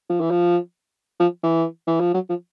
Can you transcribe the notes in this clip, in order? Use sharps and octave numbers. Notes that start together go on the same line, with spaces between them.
F3
E3
F3
F3
E3
E3
F3
F#3
F3